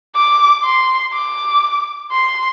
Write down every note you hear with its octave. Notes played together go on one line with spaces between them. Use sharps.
D6
C6
D6
C6